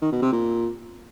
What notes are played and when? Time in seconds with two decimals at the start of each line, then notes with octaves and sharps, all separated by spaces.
0.02 D#3
0.12 B2
0.22 C3
0.32 A#2